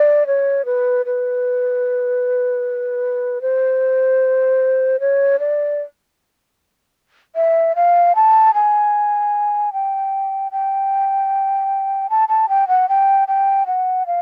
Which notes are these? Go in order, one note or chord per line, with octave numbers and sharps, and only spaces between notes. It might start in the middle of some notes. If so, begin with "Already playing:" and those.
Already playing: D5
C#5
B4
B4
C5
C#5
D5
E5
F5
A5
G#5
G5
G5
A5
A5
G5
F#5
G5
G5
F#5
F5